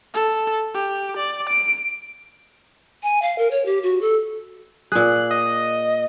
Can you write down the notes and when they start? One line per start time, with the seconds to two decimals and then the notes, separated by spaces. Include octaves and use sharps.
0.14 A4
0.74 G4
1.17 D5
1.49 D7
3.03 G#5
3.22 F5
3.38 A#4
3.51 C#5
3.66 G4
3.83 F#4
4.02 A4
4.92 A#2 G#4 F#6
5.31 D#5